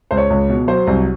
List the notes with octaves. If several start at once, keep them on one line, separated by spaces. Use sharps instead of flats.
C#2 C5
C#5
C#2
B2
F#3 C5
C2